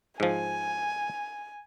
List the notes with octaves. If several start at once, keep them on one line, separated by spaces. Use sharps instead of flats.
G#2 F3 G#5